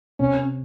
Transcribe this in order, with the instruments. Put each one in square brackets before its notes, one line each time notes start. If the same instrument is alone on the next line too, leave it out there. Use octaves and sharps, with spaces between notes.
[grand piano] C3 [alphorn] C#4